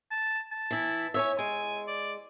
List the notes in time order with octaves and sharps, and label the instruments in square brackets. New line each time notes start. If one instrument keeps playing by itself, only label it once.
[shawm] A5
A5
[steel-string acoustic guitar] E3 E4
C#4 C#5 E5
[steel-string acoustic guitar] G#3 [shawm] G#5
[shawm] D5